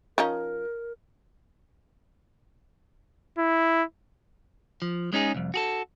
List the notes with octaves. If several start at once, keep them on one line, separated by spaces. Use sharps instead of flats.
F3 C#4 D#4 A#4
E4
F3
G#3 C#4 D#4 G#4
C2 F2
F#4 G#4 A4